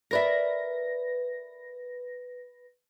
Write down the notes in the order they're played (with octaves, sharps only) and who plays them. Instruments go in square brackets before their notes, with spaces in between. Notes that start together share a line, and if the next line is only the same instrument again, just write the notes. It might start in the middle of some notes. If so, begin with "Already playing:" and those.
[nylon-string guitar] A#4 D5 E5 [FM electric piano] B4 A#6